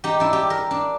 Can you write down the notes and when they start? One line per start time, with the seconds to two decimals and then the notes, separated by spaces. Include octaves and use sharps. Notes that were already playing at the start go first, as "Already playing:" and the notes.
0.04 D#4 G4
0.20 D4 E4
0.33 G4
0.50 A#4
0.71 D4